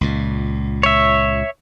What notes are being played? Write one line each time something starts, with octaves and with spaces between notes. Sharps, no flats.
C#2 A#2
C#5 E5